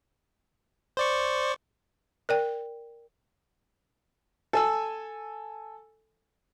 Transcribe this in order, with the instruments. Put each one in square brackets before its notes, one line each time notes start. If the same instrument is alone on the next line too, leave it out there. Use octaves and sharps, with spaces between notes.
[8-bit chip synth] C5 D5 C#6
[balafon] A#4 D5 G5
[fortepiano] A4 G#5 E6